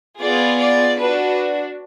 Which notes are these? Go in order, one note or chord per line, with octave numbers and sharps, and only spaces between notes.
B3 F4 G#4 D5
D5
D4 F#4 B4